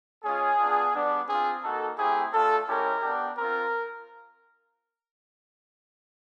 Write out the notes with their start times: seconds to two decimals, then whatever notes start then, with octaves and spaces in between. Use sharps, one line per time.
0.24 G#3 C#4 F4 G#4
0.59 B3 D4 F4
0.94 G3 B3 D4
1.28 C4 G#4
1.33 F4
1.64 A#3 D#4 F#4 A4
1.98 A3 C4 E4 G4 G#4
2.33 A3 D4 F4 A4
2.68 G#3 C#4 E4 G4 A#4
3.02 B3 D4 G4
3.37 C4 F4 A#4